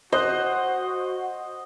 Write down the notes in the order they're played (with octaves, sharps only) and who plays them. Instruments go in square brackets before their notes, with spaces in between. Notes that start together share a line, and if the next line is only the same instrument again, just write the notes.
[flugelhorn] F#4 [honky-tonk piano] C5 F#6 [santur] D#5